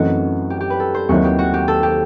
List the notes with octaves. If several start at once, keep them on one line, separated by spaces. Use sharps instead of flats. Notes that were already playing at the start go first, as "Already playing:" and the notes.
Already playing: F#2 E3 A3 C4 D#4 F#4
G4
G4
B4
A4
C5
D#2 D#3 F#3 C4 E4 F#4
G4
F#4
G4
A4
G4